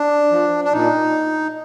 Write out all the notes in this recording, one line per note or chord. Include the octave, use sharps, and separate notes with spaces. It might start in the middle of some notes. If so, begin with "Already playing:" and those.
Already playing: D4
F3
D4
A#2 D#4